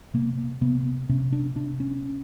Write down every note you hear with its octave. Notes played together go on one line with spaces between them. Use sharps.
C3 A#3
C3 B3
C3 C#4
D4
C3 D4
C#4